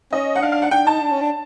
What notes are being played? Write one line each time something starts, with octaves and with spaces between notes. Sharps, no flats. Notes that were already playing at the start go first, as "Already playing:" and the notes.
C#4 D#5
F#5
D4 F5
F5
F#5
D4 G5
D#4 A5
D4
C#4
D4